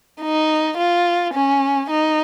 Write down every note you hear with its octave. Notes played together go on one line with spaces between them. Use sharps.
D#4
F4
C#4
D#4